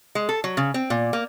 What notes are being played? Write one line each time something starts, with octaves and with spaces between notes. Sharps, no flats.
G#3
A4
F#3
C#3
C4
A#2
A#3